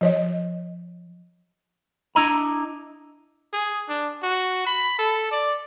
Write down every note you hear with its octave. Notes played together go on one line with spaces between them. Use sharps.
F3 C#5 D#5
D4 E4 D#5 A#5
G#4
D4
F#4
B5
A4
D5